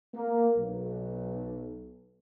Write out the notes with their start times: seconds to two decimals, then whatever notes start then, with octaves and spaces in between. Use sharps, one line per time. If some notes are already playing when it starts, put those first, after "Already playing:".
0.14 A#3
0.55 B1